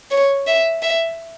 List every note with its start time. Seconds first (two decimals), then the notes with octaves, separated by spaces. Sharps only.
0.11 C#5
0.47 E5
0.82 E5